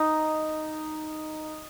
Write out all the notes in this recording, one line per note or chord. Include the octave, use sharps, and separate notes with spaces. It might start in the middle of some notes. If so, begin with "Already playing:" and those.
Already playing: D#4